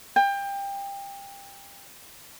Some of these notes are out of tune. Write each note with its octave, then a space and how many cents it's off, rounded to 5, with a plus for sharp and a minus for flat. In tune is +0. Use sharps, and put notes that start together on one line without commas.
G5 +25